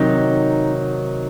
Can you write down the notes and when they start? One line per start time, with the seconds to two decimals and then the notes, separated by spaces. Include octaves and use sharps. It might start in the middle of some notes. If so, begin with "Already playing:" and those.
Already playing: C3 D#3 F#3 D#4